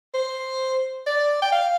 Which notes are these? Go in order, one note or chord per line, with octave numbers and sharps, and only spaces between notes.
C5
D5
G5
F5